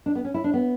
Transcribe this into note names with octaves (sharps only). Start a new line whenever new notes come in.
D4
B3
C#4
E4
D4
B3